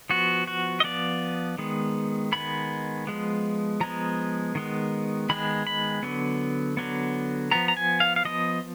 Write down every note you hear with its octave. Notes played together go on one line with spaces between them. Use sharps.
F3 B3 F#4
F#4
D#5
F3 B3 D5
D#3 G#3 B3
D#3 G#3 B3 B5
F3 G#3 B3
F3 G#3 B3 A#5
D#3 G#3 B3
D#3 G#3 B3 B5
B5
D3 F#3 B3
D3 F#3 B3
F3 B3 A#5
A#5
G#5
F5
F5
F3 B3 D#5